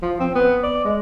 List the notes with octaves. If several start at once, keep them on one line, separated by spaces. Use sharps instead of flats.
F3
C4
B3
D5
G#3